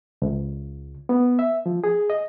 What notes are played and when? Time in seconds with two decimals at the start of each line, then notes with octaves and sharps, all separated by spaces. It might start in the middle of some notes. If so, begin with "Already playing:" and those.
0.22 C#2
1.09 B3
1.39 E5
1.66 F3
1.84 G#4
2.10 D#5